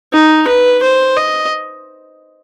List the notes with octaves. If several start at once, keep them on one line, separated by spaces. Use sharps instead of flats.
D#4
B4
C5
D#5